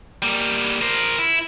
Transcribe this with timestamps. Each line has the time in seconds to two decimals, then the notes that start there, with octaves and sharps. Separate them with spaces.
0.22 G3 A#3
0.81 A#4 C5
1.18 E4